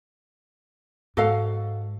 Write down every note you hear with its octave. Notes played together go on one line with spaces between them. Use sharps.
G#2 F#4 A4 F5